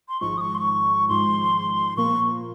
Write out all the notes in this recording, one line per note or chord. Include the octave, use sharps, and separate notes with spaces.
C6
G#1 G#2 F3 G#3 C#6
D#6
C#6
C6
C#6
G#1 G#2 F3 G#3 C6
A#2 F3 A#3 C#6